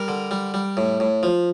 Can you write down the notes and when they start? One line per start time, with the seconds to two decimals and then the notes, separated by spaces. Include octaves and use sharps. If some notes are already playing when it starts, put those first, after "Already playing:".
Already playing: G3 A#4
0.08 D3
0.31 G3
0.54 G3
0.77 A2
1.00 A2
1.23 F3